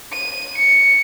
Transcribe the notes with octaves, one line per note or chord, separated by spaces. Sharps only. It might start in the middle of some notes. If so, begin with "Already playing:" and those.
D#7
C#7